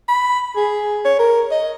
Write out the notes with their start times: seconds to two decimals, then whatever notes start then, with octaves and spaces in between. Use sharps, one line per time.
0.08 B5
0.56 G#4
1.05 C#5
1.19 A#4
1.51 D#5